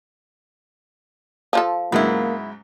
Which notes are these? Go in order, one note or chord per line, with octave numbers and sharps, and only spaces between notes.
F3 F4 A4
G#2 C#3 F#3 A#3 B3 E4